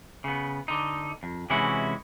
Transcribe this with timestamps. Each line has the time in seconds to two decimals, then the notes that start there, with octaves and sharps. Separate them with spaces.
0.24 C#3 B3
0.68 D3 D#4
1.23 F2
1.50 C3 E3 G#3 C#4 E4 F#4